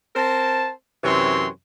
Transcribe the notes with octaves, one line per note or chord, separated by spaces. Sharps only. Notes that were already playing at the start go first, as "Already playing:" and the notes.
C4 A#4 C5 A5
F#2 C3 E3 C4 C#5 C6